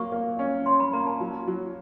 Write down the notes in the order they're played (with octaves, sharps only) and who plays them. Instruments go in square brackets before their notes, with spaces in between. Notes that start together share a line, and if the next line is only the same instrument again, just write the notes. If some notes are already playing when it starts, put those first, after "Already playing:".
Already playing: [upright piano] F#3 A#3 [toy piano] C#6
[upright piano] A#3
C#4
[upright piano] C#4 [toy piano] C6
[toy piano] B5
[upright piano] A#3 [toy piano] A#5
[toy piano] A5
[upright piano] F#3
F#3